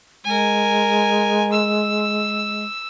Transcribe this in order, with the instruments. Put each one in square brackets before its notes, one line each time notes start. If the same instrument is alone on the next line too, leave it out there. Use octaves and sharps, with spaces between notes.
[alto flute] G#3 [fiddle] A#4 G#5
[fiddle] E6